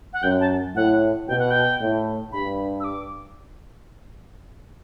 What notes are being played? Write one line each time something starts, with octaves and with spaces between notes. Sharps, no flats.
F#5
F#2 G5
A5
A2 F#5
B2 G5
F#5
G5
A2
G2 B5
E6
D6